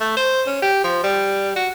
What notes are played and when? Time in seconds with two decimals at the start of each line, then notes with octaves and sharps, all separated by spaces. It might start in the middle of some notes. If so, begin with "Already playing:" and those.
0.01 A3
0.17 C5
0.47 C#4
0.62 G4
0.84 F3
1.04 G3
1.56 F#4